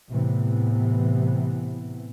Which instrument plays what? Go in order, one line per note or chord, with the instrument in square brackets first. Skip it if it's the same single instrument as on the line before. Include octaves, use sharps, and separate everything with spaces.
[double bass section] A2 C3 E3 B3